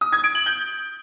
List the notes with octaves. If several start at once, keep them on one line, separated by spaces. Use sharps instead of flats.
D#6
G#6
D7
F#7
G6